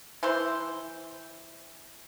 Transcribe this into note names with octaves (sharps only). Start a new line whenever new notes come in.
E3 E4 C5